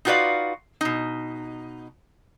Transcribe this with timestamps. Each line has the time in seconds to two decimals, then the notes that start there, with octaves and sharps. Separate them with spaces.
0.05 D#4 F4 F#4 B4 D5 F5
0.81 B2 D#4